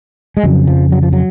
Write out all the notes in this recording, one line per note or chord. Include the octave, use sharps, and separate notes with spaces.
G#3
F2 C#3 F#3
F3
F#3
F3
F#3